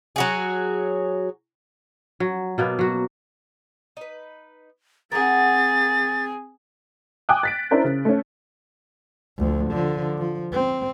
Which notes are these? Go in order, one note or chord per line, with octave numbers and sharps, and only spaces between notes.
F#3 F#4 G#4
F#3
B2 A#3 B3
F#3 F#4
D#4 B4
C4 G#4 A#4 F#5 A6
G5 G#5 D6 D#6 F#6
A6 B6 D7
C#4 D4 E4 A#4 C5
C#3
A3 C#4
D2 F3
D3 F3
F3
C4